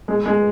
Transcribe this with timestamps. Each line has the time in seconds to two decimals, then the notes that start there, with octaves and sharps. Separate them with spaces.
0.08 G#3
0.26 G#3